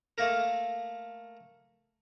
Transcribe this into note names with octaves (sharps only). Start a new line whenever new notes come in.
A3 A#3 A#4